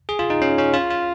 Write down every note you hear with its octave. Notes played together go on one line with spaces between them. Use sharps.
G#4
F4
D#4
C#4
C#4
F4
F4